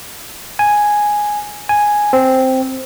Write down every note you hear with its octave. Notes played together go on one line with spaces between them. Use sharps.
G#5
G#5
C4